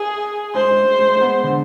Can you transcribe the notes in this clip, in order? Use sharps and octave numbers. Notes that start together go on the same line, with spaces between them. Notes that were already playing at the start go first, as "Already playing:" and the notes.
Already playing: G#4
G#3 C5
G#3
G#3
G#3
G#3
B3
D3